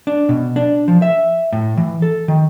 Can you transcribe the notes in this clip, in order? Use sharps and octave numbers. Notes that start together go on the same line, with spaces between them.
D4
B2
D4
F3
E5
A2
E3
A4
D#3